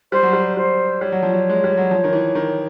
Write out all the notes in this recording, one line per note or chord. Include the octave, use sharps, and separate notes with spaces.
G3 C5
F#3
G3
G3 C5
G3 C#5
F#3
F3
F#3
G#3
G3
F#3
F3
D#3
E3
D#3